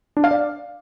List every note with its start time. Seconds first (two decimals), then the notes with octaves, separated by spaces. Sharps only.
0.17 D4
0.24 F5
0.31 D5